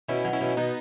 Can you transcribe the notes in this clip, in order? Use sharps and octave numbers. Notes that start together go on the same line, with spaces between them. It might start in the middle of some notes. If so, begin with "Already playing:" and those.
B2 C#4 E4
F#3
C#4 E4
B2
B2 B3 D#4